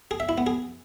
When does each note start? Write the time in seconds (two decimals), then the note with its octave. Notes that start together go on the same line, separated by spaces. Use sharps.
0.11 G#4
0.20 E5
0.29 E4
0.38 B3
0.47 G#4